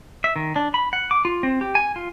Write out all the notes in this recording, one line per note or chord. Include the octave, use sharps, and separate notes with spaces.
E5
D#3
D4
B5
F#5
D6
F4
C4
G4
G#5
F4